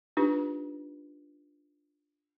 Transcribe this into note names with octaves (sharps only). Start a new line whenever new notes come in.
D4 D#4 F4 G4 B4